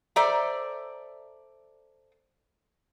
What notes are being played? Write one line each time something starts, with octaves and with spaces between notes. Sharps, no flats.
A4 C5 D5 E5 A#5